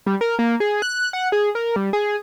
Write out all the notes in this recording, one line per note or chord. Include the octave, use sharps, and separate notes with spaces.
G3
A#4
A#3
G#4
F#6
F#5
G#4
A#4
G3
G#4